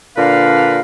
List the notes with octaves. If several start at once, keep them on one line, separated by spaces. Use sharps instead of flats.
A#2 D3 D4 A#4 B4 F5